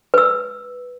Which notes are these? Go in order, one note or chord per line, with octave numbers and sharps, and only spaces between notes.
B4 E6